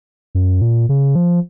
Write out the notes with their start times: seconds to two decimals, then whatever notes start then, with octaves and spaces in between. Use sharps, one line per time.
0.35 F#2
0.62 A#2
0.89 C#3
1.15 F3